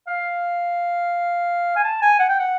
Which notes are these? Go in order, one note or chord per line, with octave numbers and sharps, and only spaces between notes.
F5
G#5
A5
G#5
F#5
G5
F#5